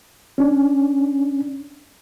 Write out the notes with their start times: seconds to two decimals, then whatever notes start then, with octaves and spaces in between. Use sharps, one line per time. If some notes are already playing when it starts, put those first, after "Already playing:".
0.38 C#4 D4